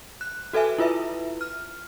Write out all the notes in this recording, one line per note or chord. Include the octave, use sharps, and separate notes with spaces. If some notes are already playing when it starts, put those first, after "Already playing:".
F#6
F#4 A4 B4 E5 G#5
E4 F4 B4 E5
F6